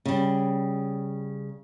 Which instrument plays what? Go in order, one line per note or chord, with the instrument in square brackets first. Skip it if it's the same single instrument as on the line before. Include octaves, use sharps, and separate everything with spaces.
[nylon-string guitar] C#3 G3